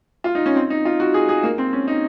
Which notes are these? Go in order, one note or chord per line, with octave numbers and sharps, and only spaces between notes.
F4
D#4
C#4
C4
D#4
F4
F#4
G#4
G#4
A#3
C4
C#4
D#4